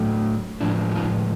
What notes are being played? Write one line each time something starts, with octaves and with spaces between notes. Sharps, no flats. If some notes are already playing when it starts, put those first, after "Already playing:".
Already playing: A2 F#3 A3
A2 F3 G#3 D4 E4
F#4
D#4 F4